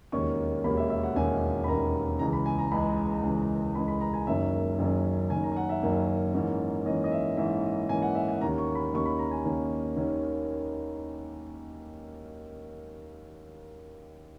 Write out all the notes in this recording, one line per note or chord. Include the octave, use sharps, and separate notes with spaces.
E1 D#2 D#3 A#3 C#4 C#6
E1 D#2 D#3 A#3 C#4 B5
E5
E5
F#5
E1 D#2 D#3 A#3 C#4 G#5
B5
E1 D#2 D#3 A#3 C#4 A#5
C#2 C#3 E3 G#3 A#5
B5
G#5
A#5
C#2 C#3 E3 G#3 B5
C#2 C#3 E3 G#3
C#2 C#3 E3 G#3 B5
B5
A#5
G#5
F#1 F#2 D#3 A#3 C#4 E5
F#1 F#2 D#3 A#3 C#4
F#1 F#2 D#3 A#3 C#4 G#5
A#5
G#5
F#5
E5
F#1 F#2 D#3 A#3 C#4
G#2 E3 A#3 C#4
G#2 E3 A#3 C#4 D#5
D#5
E5
G#2 E3 A#3 C#4 E5
G#2 E3 A#3 C#4 G#5
F#5
E5
F#5
D#2 D#3 A#3 C#4 A#5
C#6
B5
D#2 D#3 A#3 C#4 C#6
B5
A#5
G#5
D#2 D#3 A#3 C#4
D#2 D#3 A#3 C#4